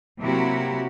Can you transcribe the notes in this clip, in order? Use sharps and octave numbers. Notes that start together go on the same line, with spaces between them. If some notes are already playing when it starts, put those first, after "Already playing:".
C3 F#3 A#3 E4 F#4 G4